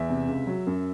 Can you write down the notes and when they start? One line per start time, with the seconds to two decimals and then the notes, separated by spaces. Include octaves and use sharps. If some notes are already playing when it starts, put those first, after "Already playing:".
Already playing: E2 E5
0.10 C3
0.28 C#2
0.47 F#3
0.67 F#2